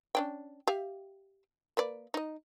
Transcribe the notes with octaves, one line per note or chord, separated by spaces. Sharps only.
C#4 D4 G5
G4 E5 F5
A#3 B4 D5
D#4 D#5